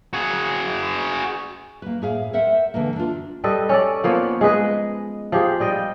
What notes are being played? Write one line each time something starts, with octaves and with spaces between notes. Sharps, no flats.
F#4 G#4
A#3 B4
A2 G#4 F5
A#4 C5 E5 F#5
D3 E3 G#3 A#3
D4 F4
G3 A4 B4 D#5
C#4 A4 D5
F3 A#3 B3 C#5
G#3 G#4 B4 D#5
F3 G4 G#4
G3 D#5 G5